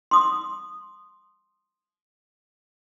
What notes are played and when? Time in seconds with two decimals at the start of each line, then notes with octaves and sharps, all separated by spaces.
0.11 C6 D#6